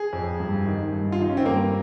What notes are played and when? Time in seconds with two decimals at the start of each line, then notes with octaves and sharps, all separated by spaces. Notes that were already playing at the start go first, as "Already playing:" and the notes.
Already playing: G#4
0.13 F2
0.40 G2
0.66 D#3
0.93 G2
1.12 F4
1.19 D#3 D#4
1.29 C#4
1.37 C4
1.44 G2 A#3